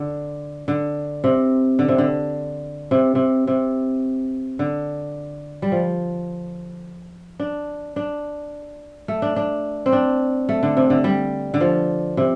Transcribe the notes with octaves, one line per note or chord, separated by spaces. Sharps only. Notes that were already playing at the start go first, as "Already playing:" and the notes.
Already playing: D3
D3
C3
D3
C3
D3
C3
C3
C3
D3
G3
F3
D4
D4
A3
D4
D4
C4
D4
A3
D3
C3
D3
G3
D3
F3
C3